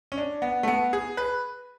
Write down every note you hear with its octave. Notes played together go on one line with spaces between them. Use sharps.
C#4
D4
B3
A3
B3
G#4
B4